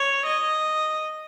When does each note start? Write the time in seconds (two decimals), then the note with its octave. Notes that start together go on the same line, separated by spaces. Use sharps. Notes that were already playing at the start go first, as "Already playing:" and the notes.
Already playing: C#5
0.26 D#5